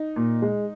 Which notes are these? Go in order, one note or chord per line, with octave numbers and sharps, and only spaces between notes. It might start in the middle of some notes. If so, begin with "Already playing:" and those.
Already playing: D#4
A#2
G#3